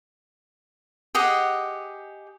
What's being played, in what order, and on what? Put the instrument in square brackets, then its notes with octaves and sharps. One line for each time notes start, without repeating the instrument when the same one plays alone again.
[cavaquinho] G4 G#4 D#5 F#5